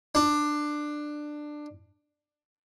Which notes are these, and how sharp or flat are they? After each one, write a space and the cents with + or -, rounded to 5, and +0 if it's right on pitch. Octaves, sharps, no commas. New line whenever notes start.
D4 +15